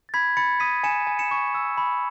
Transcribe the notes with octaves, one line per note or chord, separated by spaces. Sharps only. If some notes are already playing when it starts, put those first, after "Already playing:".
A6
B5 G#6 B6
B5 A6 C#7
D#6 B6 D#7
G#5 C#7 E7
G#5
C#7 E7
C#6
E6
B5